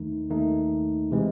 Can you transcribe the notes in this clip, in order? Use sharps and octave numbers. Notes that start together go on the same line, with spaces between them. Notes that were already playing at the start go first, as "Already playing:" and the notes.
Already playing: D#2 D#3 A3 D#4
D#2 D#3 A3 D#4
C3 E3 G#3